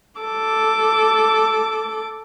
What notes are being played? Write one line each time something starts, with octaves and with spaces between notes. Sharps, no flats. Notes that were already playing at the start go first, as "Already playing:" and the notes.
A4 D6